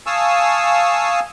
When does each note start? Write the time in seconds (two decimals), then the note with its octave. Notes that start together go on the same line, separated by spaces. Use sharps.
0.06 F5 G#5 A5 C#6 D#6 E6